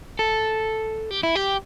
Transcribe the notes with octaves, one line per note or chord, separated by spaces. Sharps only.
A4
G4
E4
G4